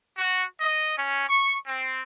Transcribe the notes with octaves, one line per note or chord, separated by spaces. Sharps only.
F#4
D#5
C#4
C#6
C4